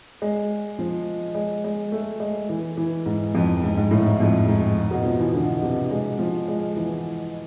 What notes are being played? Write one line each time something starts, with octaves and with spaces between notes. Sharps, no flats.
G#3
F3
G#3
G#3
A3
G#3
E3
E3
G#2
F2
G#2
G#2
A2
G#2
F2
G#2
B2
F3
E3
D3
C3
G#3
F3
G#3
E3